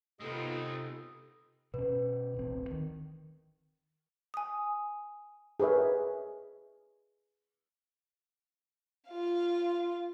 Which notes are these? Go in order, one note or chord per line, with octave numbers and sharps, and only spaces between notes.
C3 G#3 B3 C4 D#4 F4 A4 D#5
B2 C#4 B4
D1 A1 C4
D#3
G#5 D#6
G#4 A#4 B4 C#5 E5
F4 F5